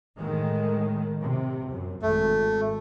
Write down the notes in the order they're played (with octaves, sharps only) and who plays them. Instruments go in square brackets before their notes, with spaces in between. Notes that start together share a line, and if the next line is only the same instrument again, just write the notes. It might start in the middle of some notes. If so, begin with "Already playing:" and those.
[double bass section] A2 D#3 G#3
C3
F#2
[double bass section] G#1 [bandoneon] A3